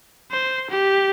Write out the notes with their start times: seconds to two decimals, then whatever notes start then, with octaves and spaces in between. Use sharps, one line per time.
0.32 C5
0.70 G4